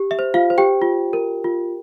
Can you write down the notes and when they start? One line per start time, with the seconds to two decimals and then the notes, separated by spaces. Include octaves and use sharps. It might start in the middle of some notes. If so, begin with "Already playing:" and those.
Already playing: G4
0.11 E5
0.19 C5
0.34 F4 F5
0.50 C5
0.58 G4 G5
0.82 F4
1.13 A#4
1.44 F4